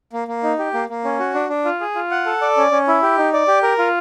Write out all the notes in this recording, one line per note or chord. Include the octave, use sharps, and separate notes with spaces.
A#3
A#3
D#4
G4
A#3
A#3
C#4
F#4
D4
D4
F4
G#4
F4
F#5
A4
D5
C#4
C#4
E4
G4
D#4
D5
G4
A#4
F4